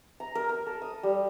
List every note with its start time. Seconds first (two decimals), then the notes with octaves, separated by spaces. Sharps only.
0.20 A#5
0.35 A#4
0.49 A#4
0.66 A4
0.82 D#6
1.03 G3